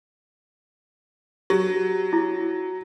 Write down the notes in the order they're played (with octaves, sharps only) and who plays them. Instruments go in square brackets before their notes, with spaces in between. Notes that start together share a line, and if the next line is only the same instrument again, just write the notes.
[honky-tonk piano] F#3 [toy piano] G4
[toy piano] E4